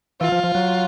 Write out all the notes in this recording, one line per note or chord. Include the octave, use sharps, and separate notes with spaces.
E3 F4
F3
F3
F#3